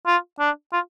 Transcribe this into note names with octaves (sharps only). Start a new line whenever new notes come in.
F4
D4
F4